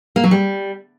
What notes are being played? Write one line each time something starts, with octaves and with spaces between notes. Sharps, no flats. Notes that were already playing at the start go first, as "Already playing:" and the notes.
A#3
F#3
G3